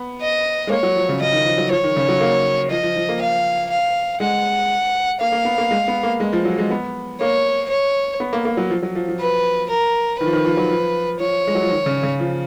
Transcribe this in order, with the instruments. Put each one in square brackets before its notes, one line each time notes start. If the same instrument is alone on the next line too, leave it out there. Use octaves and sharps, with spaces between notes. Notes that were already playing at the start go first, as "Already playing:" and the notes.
Already playing: [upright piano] B3
[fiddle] D#5
[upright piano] G#3
[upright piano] A#3 [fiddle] C#5
[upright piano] F#3
F3
C#3
[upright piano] C#3 [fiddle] D#5
[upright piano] D#3
F3
F#3
[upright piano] F3 [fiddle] C#5
[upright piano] D#3
C#3
F#3
A#3
[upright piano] F3 [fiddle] D#5
[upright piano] F3
F3
A#3
[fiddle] F5
F5
[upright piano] G#3 [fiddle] F#5
[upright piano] A#3 [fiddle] F5
[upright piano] A#3
B3
A#3
G#3
B3
A#3
G#3
F3
F#3
G#3
B3
[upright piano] A#3 [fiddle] C#5
[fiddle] C#5
[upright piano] B3
A#3
A#3
F#3
F3
F#3
F3
F3
[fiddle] B4
A#4
[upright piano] D#3 [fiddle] B4
[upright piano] F3
D#3
F3
F#3
F3
[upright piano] F3 [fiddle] C#5
[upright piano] G#3
F#3
F3
D#3
C#3
C#3
F3